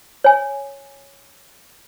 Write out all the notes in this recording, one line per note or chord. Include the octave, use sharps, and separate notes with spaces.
C#5 G#5